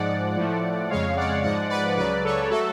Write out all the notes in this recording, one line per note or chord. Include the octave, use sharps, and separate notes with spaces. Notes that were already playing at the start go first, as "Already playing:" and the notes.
Already playing: G#2 F3 G#3 D5 F#5
A2 F3 A3
F2 C#3 G#3 C#5 F5
D5 F#5
G#2 F3 G#3 D5 F#5
B4 D5
C#2 C#3 F#3 B4 D5
A4 C#5
F#3 A3 F#4 A4